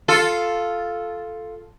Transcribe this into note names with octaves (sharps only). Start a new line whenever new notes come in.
F4 A4